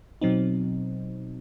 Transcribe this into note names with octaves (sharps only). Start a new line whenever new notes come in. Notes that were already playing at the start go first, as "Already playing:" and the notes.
B2 F#3 C4 D#4